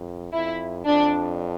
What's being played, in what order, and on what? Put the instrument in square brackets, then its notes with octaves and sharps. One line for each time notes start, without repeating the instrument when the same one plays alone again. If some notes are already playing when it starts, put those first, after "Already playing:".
Already playing: [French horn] F2
[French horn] F2 [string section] E4
[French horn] F2 [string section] D4